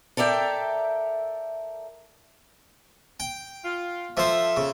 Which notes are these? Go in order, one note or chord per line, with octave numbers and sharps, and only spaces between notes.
A4 A#4 D5 E5 G5
G5
F4
F3 A4 C5 E5
C#3